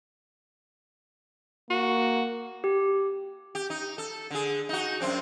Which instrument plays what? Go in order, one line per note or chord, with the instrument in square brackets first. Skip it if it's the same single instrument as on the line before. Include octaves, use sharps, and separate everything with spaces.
[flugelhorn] A#3 [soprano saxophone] F#4
[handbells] G4
[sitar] G4
D#4
A4
D3 G#4
D#4 F#4
F#2 C4 D4